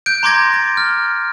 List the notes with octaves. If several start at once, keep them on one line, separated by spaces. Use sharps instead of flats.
F#6 G6 D7
A#5 C6 D6 G#6 A#6
A6
F6